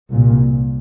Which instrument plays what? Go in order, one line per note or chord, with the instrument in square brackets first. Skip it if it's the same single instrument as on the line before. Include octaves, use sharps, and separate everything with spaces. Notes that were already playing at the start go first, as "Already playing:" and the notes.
[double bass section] C2 A#2